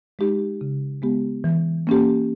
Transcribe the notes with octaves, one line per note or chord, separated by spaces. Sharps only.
G#3 D#4 G4
C#3
G#3 B3 G4
E3
A#3 C#4 G4